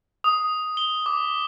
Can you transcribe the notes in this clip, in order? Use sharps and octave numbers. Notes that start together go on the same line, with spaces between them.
D#6
G7
D6